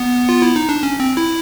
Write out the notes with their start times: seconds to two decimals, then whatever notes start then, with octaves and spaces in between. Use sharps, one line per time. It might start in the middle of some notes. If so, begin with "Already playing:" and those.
Already playing: B3
0.29 F4
0.42 E4
0.56 D#4
0.69 D4
0.83 C#4
1.00 C4
1.17 E4